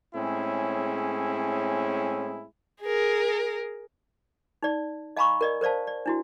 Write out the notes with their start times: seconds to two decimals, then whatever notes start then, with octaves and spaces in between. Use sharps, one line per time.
0.15 A2 G#3 C4 C#4 E4 G#4
2.81 G#4 A#4
4.63 D#4 D5
5.17 D#5 F5 G#5 A#5 B5 C#6
5.41 A#4 D5 D#5
5.61 A#4 C5 D5 F5 A5
5.87 D5
6.06 D4 E4 F#4